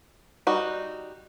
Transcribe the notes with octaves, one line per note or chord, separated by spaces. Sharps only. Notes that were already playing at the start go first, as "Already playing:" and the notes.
G3 D#4 F#4